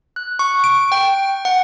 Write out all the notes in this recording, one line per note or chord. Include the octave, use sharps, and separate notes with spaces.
F#6
C#6
D7
G5
F#5